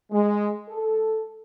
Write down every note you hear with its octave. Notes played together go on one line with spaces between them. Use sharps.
G#3
A4